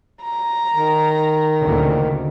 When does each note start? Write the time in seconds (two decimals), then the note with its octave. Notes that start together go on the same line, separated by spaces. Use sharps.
0.23 A#5
0.75 D#3
1.63 D2 A#2 C#3